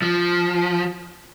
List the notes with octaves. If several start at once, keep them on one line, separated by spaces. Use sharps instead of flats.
F3